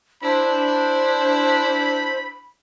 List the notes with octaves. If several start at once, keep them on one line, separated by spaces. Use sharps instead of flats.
D4 E4 C5 B5